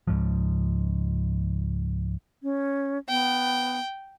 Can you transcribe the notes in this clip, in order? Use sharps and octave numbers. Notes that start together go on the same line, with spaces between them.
C#2 G#2 F3
C#4
B3 G5